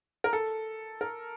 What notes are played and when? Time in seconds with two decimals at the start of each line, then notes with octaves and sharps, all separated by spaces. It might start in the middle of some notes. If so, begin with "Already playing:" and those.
0.24 A#4
0.33 A4
1.01 A#4